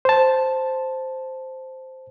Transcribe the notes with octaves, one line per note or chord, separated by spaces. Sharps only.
C5 A5